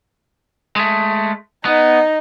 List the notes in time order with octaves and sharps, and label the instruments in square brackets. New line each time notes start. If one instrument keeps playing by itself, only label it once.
[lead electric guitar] G#3 A3
[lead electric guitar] B3 [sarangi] D#4